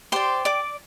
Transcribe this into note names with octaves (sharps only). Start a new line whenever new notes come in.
G4 C5 D5 C6
D5 D6